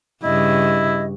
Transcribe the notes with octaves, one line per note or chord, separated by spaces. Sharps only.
G2 C#3 E4 D#5